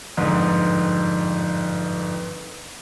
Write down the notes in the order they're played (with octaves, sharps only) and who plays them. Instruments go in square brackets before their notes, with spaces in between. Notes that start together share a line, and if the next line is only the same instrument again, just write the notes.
[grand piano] G1 F2 G#2